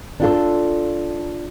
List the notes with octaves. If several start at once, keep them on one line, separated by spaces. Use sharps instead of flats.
D4 F4 A4